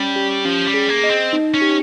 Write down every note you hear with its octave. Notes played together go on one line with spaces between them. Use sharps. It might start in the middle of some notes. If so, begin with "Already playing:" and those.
Already playing: G3 C#4
G4
F3 C#4
G3
G#4
A#3
D#5
C4
D#4
C#4
G4